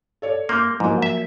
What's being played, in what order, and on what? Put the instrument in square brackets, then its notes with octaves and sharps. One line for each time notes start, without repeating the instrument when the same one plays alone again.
[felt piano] A4 C#5 D5
[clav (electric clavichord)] A#3 [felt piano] C6 D6 G6
[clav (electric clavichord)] G#2 [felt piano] F3 F#3 A#3
[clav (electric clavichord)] E5